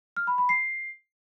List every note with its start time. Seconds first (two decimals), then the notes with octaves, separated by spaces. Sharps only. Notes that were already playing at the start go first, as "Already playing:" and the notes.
0.17 F6
0.27 B5
0.38 B5
0.49 C7